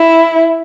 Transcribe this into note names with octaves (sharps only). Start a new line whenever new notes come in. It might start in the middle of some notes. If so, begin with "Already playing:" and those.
Already playing: E4